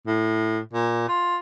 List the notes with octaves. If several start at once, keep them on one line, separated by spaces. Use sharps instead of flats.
A2
A#2
F4